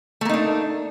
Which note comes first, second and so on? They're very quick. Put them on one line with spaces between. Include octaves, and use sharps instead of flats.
A3 A#3 D#4 D4